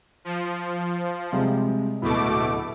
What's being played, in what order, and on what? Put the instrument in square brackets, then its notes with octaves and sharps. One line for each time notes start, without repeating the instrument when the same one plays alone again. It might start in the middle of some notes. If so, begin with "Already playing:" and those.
[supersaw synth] F3
[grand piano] C3 G3 G#3
[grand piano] D1 E4 [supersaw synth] B2 A3 D6